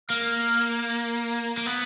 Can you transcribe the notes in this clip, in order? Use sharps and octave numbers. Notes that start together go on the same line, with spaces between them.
A#3 F6
A#3
B3